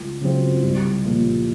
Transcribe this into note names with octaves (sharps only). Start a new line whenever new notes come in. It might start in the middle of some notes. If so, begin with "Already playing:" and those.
Already playing: C#2
C#3 F#3 C4 F4
C2
A#2 F3 A#3